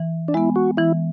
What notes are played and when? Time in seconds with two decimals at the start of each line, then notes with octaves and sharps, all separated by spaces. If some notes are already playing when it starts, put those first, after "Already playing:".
Already playing: E3
0.28 D4
0.34 G#3 B3 E4
0.56 F#4
0.77 E3 E4